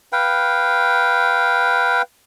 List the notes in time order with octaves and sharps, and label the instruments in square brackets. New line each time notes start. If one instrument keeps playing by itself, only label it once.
[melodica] B4 F5 G5